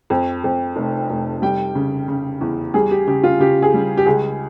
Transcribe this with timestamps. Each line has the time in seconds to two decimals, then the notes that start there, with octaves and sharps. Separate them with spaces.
0.10 F2
0.44 F2
0.76 F1
1.10 F1
1.42 G3 G5
1.75 C#3
2.08 C#3
2.41 E2
2.74 G3 G#4
2.91 G4
3.07 C#3 G4
3.24 F4
3.40 C#3 G4
3.62 G#4
3.74 G3
3.97 G4
4.06 C#2 G#4